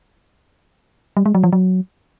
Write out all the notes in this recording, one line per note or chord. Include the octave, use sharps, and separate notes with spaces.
G3
G#3
F#3
F3
F#3